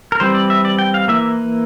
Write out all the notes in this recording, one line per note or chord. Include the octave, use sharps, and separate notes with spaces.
A#4
E3 G3 C4 C5
D5
E5
D5
G5
F5
E3 A#3 E5